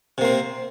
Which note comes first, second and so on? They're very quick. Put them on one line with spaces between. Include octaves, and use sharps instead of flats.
C3 A#3 C4